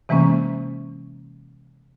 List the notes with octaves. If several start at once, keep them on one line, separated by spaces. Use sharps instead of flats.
C3 E3 G#3 A#3 C#4